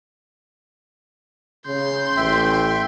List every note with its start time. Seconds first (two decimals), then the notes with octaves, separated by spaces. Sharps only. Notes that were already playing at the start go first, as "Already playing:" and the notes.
1.67 C#3 C6 G6
2.17 A1 E5 G5